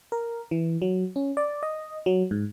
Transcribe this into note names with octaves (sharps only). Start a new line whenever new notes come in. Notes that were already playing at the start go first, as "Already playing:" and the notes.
A#4
E3
F#3
C#4
D5
D#5
F#3
G#2